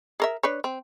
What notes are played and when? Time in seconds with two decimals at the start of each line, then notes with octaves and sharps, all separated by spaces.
0.20 G#4 A#4 E5
0.43 D4 B4 C#5
0.64 C4